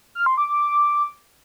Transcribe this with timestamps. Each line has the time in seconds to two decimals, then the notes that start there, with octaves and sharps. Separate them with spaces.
0.15 F6
0.26 C6
0.38 D6
0.49 D6